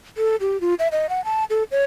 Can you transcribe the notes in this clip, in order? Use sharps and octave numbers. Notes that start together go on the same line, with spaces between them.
A4
G4
F4
E5
D#5
F#5
A5
A4
C#5